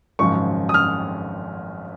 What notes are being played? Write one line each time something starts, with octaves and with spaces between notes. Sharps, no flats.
G#1 F#2 C#3 F3 C#6
D#6
F6